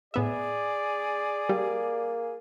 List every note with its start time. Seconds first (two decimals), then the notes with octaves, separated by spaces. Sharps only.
0.14 A2 B3 G#4 D5 E5
1.49 G3 A#3